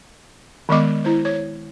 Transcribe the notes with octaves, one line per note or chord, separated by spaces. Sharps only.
D#3 G#3 B3 D#5 D6
E4 C5
C#5